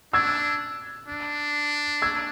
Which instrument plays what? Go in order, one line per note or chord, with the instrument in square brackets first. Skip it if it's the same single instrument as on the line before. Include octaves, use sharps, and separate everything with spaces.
[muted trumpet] D4 [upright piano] E6 G#6
[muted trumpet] D4
[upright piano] E6 G#6